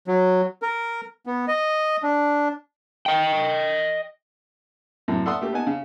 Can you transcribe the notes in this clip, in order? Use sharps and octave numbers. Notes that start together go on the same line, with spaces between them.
F#3
A#4
B3
D#5
D4
D#5 G5
F#2 A2 C3
A4 D5 E5 F#5 C6 D#6
A3 A#3 G4
B3 D#4 F#5 G#5 A5
C#3